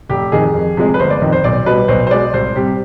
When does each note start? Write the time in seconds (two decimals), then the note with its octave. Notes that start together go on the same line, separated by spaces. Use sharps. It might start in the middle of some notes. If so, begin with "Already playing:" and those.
0.09 F1 G4
0.32 F2 D#3 G#4
0.54 F2
0.77 C3 F3 G#3
0.94 B4
0.99 G1 C5
1.10 D5
1.22 F2 D#3
1.32 C5
1.44 B1 D5
1.66 B2 G3 B4
1.88 B1 C5
2.07 C5
2.11 B2 G#3 D5
2.33 C2 C5
2.56 C3 G3 G4